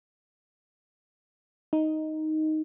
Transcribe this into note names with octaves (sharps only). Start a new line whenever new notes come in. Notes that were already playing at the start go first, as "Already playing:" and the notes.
D#4